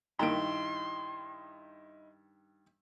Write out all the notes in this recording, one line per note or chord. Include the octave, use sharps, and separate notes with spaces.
G2 D#3 A#3 D#4 E4 A#5 C6 D7